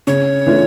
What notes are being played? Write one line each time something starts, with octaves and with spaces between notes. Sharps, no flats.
C#3 C#5
E3 A3 D4 F4